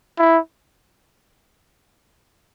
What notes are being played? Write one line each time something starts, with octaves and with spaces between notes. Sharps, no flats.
E4